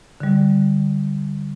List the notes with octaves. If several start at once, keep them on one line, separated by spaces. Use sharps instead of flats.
D3 G3